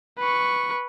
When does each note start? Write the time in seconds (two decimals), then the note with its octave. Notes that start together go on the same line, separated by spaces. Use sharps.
0.19 B4 C#6